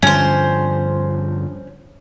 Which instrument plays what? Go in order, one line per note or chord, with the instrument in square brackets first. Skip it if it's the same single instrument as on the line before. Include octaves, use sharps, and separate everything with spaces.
[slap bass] G2 D3 F3 [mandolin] C#4 C5